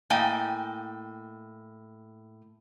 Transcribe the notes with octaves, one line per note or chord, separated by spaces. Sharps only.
A2 A#3 D#5 G5 G#5